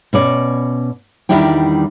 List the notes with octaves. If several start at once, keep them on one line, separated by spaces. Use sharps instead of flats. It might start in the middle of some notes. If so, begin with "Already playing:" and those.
B2 C#4 D5
E2 D#3 G3 D4 E4 G5